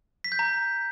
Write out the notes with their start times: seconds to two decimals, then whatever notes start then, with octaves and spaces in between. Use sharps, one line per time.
0.24 B6
0.32 G6
0.39 A#5